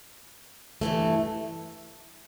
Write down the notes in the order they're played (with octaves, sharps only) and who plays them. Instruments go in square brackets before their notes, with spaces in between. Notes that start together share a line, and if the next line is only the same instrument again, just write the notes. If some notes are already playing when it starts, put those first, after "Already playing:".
[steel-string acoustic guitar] G2 E3 A3